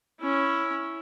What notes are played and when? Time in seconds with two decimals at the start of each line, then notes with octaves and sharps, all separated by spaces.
0.20 C#4 E4